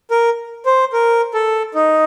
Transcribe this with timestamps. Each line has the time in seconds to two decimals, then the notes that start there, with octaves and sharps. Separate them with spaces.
0.11 A#4
0.66 C5
0.93 A#4
1.34 A4
1.74 D#4